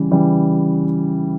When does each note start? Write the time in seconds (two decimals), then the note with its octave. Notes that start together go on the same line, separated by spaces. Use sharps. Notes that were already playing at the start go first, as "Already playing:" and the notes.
Already playing: C#3 E3 G3
0.11 C#3 E3 G3